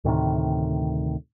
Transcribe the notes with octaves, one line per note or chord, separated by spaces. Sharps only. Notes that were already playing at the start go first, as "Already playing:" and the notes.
D2 A2 C3 D#3